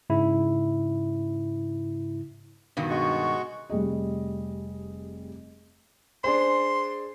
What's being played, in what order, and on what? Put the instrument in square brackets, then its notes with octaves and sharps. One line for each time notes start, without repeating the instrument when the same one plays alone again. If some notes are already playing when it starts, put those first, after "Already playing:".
[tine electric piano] G#2 C#3 E4
[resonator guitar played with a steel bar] G2 B2 D#3
[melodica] G#3 F#4 C#6
[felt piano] F1 G3 G#4 D#5
[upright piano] D4 G#4 C5 [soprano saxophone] C6